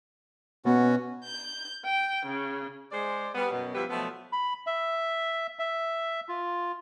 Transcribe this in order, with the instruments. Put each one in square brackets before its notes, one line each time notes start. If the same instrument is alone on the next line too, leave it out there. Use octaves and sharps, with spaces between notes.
[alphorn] B2 [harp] B3 [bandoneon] C#4 F#4 [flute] F#5
[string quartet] G6
G5
C#3
[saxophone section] G#3 C5 D5
G3 B3
F#2 B2 F#3
F3 G3 B3 E4 G4 B4
B2 F3 F#3 A3 B3
[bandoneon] B5
E5
E5
F4